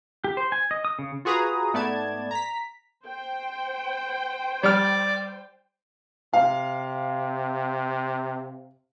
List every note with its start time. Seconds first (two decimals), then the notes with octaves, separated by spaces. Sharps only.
0.24 G4
0.37 C5
0.52 G#5
0.71 D#5
0.85 D#6
0.99 C#3
1.25 F4 F#4 G#4 B4 A#5 D#6
1.73 G#2 A3 B3 D5 A5 G#6
2.31 A#5 B6
3.05 C5 G5
4.63 G3 D5 F6
6.33 C3 F5